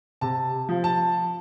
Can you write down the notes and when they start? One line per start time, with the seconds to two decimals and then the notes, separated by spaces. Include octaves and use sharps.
0.21 C3 A5
0.69 F3
0.84 A5